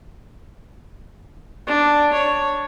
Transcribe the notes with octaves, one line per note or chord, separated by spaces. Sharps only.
D4
C#5